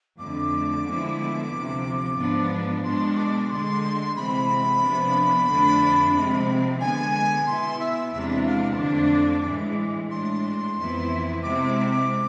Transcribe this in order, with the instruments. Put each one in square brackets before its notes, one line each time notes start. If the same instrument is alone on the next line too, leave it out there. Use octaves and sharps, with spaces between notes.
[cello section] F2 D3 A3 [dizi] D6
[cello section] D3 F3 G#3 B3 E4
D2 C3 F3
G#2 F3 B3 D4
[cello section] B2 G#3 D4 [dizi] C6
[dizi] D6
[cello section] D2 D3 G#3 [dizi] C6
[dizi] C6
[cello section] C3 E3 G#3 C4 [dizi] B5
[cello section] C3 F3 B3 D4
F2 D3 A3 D4
C3 F3 G#3 C4
[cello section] D3 G#3 B3 [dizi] G#5
[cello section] B2 B3 E4 [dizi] C6
[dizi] E5
[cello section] E2 C3 E3 G#3 D4 [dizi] E5
[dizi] F5
C6
[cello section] F2 D3 A3 D4 [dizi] D6
[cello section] A2 E3 G#3
[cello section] A2 G#3 D4 [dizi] C6
[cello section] F2 E3 B3 E4
[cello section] C3 G#3 C4 E4 [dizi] D6